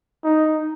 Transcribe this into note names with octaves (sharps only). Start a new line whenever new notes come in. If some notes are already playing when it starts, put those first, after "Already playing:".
D#4